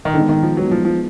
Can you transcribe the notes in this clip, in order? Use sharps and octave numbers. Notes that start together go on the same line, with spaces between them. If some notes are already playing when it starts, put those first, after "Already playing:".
D#3
D3 G#3 B3 D#4
D#3
F3
F#3 G#3 B3 D#4
F3
F3